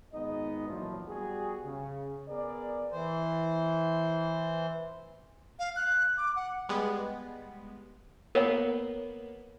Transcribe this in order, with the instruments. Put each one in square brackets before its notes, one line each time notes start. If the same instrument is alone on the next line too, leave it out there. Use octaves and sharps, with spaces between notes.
[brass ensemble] G#1 G#3 B3 D#4 D#5
A1 A#2 F3 F#3 D4 E4
G3 B3 F#4 G#4
C#3
B3 G#4 A#4 D5
[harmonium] E3 C5
[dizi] F5
F#6
D6
F#5
[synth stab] G3 G#3 B3
[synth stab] A#3 B3 [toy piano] A#4 C#5 F#5